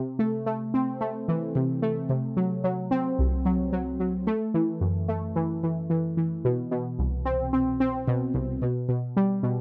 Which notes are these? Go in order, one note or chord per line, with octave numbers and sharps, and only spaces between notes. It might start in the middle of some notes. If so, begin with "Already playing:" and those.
Already playing: C3
A3
A3
C4
A3
E3
C3
A3
C3
F#3
F#3
C4
C2
F#3
F#3
F#3
A3
E3
F#2
A3
E3
E3
E3
E3
B2
B2
C2
C4
C4
C4
B2
C2
B2
B2
G3
B2